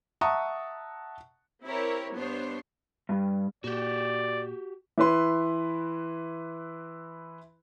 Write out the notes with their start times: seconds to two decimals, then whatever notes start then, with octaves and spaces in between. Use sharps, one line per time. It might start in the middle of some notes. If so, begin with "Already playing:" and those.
0.21 E5 F#5 A5 A#5 C#6 D#6
1.64 C4 E4 G4 A#4 C#5
2.15 G2 B3 D4 C5 C#5
3.09 G2
3.64 A#2 F#4 G4 D5
4.98 E3 E4 B4 C6